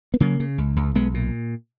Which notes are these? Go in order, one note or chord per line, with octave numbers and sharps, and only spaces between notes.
B3
C#3 F#3 A#3
C#3
C#2
C#2
B1 G#3 B3
A#2